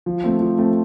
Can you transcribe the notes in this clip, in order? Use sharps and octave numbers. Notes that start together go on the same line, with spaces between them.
F3
A3 C4
F3
A3 C4